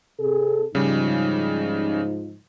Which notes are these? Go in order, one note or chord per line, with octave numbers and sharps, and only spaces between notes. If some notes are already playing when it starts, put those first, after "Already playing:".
C3 G#4 A4
G#2 C#3 F3 G3 D#4